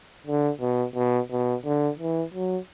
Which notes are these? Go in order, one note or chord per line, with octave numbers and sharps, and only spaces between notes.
D3
B2
B2
B2
D3
E3
F#3